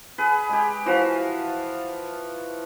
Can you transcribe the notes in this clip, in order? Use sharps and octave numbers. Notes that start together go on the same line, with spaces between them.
G#4 B4
G#3 G4
E3 F3 F#4 F5